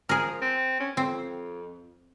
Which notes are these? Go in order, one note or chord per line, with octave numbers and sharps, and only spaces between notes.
F3 G#4 A#4
C4
C#4
F2 C4